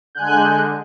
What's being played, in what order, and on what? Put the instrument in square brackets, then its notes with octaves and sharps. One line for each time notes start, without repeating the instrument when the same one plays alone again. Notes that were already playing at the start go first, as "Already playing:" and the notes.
[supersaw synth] D3 G#3 [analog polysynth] G#5 F#6 G6